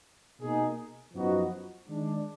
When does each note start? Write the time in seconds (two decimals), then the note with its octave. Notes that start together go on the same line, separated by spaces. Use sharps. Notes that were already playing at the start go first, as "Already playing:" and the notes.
0.39 B2 A#3 D#4 G#4
1.13 F#2 F3 B3 D#4 F#4
1.87 D#3 G#3 D4